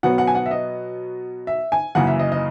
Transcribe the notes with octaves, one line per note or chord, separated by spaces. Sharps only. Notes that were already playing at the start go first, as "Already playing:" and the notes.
B2 F#3 B3 F#5
F#5
G#5
F#5
E5
D#5
E5
G#5
F#2 C#3 E3 A#3 F#5
E5
D#5
D#5